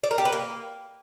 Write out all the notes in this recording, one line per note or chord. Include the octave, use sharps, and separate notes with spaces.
D5
A#4
G4
B4
A#3